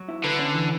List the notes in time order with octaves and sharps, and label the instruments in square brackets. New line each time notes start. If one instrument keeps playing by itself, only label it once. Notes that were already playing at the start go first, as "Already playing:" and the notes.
Already playing: [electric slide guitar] F#3
E4
[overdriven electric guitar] D3 [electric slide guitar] B4
[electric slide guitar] C#4
E3